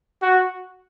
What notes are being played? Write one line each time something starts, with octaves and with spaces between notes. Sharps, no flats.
F#4